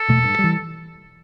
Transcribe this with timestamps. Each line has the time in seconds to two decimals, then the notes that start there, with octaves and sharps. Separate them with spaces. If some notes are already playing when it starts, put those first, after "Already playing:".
Already playing: A4
0.08 E2 B2 A3
0.24 G2
0.39 G3
0.44 E3